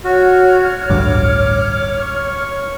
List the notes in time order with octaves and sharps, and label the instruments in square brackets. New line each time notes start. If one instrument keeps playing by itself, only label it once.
[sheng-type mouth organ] F#4 [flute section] C#5 F6
[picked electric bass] A1 D2 G2 [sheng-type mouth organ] D6
[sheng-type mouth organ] C#6